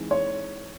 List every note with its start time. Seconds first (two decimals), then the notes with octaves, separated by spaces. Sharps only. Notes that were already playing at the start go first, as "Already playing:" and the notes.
Already playing: E3 G#3 C4 D#4
0.11 C#5